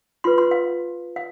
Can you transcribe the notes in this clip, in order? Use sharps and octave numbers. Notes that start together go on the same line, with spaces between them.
F4 B4 C6
C6
F5
F5